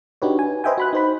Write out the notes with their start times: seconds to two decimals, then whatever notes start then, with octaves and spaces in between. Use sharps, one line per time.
0.22 D4 D#4 F#4 G4 B4 C#5
0.39 G#5
0.64 B4 C5 D#5 E5 G5 G#5
0.78 F#4 B5 F#6
0.93 D#4 C5 B5